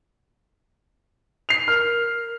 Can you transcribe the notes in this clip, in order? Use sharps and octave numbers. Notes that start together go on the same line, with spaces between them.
C7 F7
A#4 F6